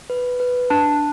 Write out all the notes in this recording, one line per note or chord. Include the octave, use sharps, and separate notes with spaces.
B4
B4
D4 A5